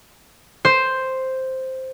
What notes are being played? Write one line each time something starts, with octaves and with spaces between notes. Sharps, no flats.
C5